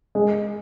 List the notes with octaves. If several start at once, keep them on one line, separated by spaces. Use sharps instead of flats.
G#3